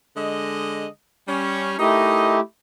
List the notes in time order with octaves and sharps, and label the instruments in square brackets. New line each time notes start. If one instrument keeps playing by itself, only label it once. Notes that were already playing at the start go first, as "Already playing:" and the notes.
[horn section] D3 G#3 D#5
G3 C#4
[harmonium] A3 E4 G4 [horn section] D#4 A#4 D#5